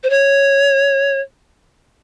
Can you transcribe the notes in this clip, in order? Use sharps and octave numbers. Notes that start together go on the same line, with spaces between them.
C5
C#5